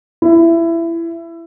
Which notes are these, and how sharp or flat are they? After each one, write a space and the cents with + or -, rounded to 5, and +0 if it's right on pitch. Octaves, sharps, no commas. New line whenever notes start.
E4 +20